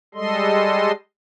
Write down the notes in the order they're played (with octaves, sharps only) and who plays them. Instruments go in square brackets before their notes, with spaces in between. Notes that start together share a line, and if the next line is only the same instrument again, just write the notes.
[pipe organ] G3 G#3 A4 D#5 C6